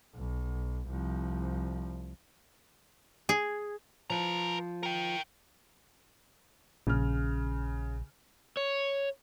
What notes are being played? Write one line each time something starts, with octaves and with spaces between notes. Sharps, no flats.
B1
C2 F3
G#4
F3 B4 A#5
A#4 G5
A#1 C#3 F6
C#5